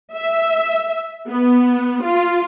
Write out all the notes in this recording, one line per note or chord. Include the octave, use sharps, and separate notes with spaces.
E5
B3
F4